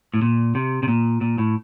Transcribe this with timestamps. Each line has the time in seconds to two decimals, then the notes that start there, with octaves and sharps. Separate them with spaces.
0.14 A2
0.22 A#2
0.55 C3
0.83 C3
0.88 A#2
1.21 A#2
1.38 A2